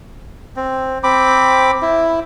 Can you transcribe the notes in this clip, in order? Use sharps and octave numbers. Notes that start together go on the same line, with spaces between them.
C4
C4 B5 D6
E4